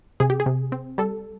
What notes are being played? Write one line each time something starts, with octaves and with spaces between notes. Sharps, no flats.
C3 G#4
G4
G#4
C3
C4
G3 A4